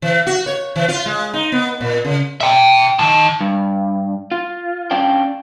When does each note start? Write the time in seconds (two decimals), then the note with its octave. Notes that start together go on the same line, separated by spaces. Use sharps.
0.02 E3
0.27 F#4
0.46 C#5
0.76 E3
0.88 F4
1.06 G#3
1.33 D#4
1.52 B3
1.81 A#2
2.05 C#3
2.41 E5 G5
2.99 D#3 A5
3.41 G2
4.32 F4
4.91 C#4 D4 F5 G5